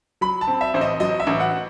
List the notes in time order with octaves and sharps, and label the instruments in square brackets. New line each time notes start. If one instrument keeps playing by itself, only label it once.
[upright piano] F#3 [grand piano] B5
[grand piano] A5
[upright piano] C4
[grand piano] E5
[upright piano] A1 [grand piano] C5
[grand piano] D#5
[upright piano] F#3 [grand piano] D#5
[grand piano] E5
[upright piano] A1
[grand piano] F#5